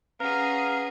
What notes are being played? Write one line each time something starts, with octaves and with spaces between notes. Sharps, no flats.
C#4 G#4 B4 F5 F#5 A#5 F6